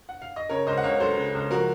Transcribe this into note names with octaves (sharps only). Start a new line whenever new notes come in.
F#5
F5
D#5
C#3 A#4 C#5
C#2 C5 D#5
F#5
C#2 C#5 F5
F#3 A4 C5
C#3
C#2
F3 F#4 A#4